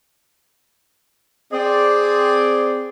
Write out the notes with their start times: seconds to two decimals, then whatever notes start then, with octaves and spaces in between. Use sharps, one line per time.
1.53 C4 G#4 D5